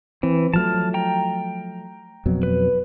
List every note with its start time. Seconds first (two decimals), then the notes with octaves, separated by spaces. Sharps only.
0.23 E3 C4
0.54 F3 F#3 A3 A5 F6
0.94 G5 A#5
2.26 F2 B2 F#3
2.43 B4